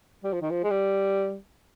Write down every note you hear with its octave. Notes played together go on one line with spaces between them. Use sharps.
G3
F3
D#3
F3
G#3
G3